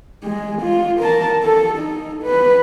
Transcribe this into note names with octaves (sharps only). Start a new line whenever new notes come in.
G#3
F4
A#4 A5
A4
D#4
B4